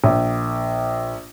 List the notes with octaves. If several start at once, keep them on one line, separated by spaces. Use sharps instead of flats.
A#1